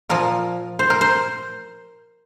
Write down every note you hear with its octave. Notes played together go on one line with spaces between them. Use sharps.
A#2 F3 A#4
C5
A#4
C5